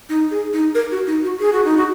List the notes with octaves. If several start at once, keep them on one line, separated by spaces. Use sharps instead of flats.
D#4
G#4
D#4
A#4
F#4
D#4
F#4
G#4
F#4
D#4
F#4